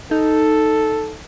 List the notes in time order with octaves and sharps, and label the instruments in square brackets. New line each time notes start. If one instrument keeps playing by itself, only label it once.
[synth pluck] D#4 [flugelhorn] A4